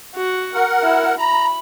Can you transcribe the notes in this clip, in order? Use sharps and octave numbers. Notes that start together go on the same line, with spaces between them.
F#4
A#4 F#5
E4
A#5 B5